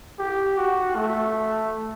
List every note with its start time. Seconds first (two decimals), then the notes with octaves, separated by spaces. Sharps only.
0.19 G4
0.57 F#4
0.96 A3